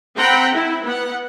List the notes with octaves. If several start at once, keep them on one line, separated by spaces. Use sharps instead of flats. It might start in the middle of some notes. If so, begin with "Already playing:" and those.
C4 F#5 G5 A#5 B5
E4
B3 F#5